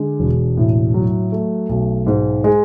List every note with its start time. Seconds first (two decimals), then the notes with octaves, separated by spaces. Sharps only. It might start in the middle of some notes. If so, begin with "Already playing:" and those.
Already playing: D3 G#3
0.20 E1
0.57 A2
0.94 F#3
1.32 A3
1.69 B1
2.07 G#2
2.44 G#3